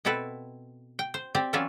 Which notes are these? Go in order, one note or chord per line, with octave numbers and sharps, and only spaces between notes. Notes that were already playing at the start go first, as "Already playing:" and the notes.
B2 C4 E4 A4 B4
G5
C5
C4 G4 C5 D5
E3 F#3 C#4 F4 D5 E5